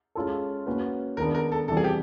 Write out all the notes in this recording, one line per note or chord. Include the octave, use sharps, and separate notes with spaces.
G#3 C#4 F4 A4
A#3 C#4 F#4 B4
D#3 G#3 B3 D4 A#4
A#4
A4
C3 E3 G3 A4
G#4
G4